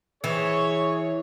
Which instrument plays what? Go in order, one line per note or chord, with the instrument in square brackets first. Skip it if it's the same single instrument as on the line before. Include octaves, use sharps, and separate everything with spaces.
[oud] E3 [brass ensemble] G#4 C#5